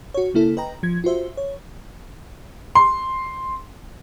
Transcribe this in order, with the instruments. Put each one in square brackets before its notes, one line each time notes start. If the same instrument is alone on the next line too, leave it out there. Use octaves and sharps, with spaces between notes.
[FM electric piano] F#4 C#5
C#3 A#3 E4 A4
B4 D#5 G5 A#5
F3 G#6
F4 F#4 C5 E5
C#5
[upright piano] C6